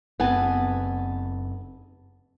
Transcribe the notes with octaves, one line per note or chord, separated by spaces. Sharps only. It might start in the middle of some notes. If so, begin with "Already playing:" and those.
F#1 B3 C4 G#5 A5